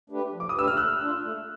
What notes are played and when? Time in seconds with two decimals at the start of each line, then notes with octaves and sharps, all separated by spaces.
0.10 A3 D4 G4 B4
0.32 F3
0.40 D6
0.49 D#6
0.55 A3 D4 G4 B4 E6
0.67 F6
0.77 A3 E6 F#6
1.01 D4 F4
1.22 A3